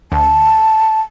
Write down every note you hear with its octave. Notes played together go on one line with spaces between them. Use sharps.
D2 A5